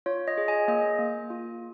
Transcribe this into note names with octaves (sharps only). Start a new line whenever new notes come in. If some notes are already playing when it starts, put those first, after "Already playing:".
F4 C#5
D#5
G#4
D#5 G#5
A#3 D#5
A#3
F4